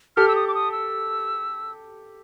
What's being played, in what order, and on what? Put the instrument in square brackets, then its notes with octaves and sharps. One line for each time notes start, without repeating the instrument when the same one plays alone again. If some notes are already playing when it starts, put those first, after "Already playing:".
[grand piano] G4 A4 [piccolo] F6
[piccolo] E6
D#6
D6
D#6
E6